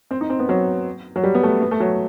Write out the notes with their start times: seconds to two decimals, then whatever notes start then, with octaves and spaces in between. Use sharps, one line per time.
0.11 C4
0.21 D#4
0.30 C4
0.39 B3
0.49 F#3
1.16 F#3
1.24 G3
1.35 B3
1.43 A3
1.62 B3
1.71 A3
1.80 F#3